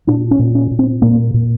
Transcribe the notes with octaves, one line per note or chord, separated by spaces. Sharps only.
A#2 D4
C#4
A#2
C#4
A#2
C4
A#2 A#3
A#2